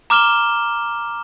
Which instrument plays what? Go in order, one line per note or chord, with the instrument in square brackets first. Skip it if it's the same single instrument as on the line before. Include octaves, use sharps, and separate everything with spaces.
[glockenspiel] A#5 D6 F6 E7 G7